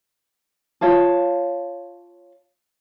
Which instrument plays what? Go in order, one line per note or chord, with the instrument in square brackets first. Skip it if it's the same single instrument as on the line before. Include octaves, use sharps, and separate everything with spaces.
[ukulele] F4 C#5 F5 A5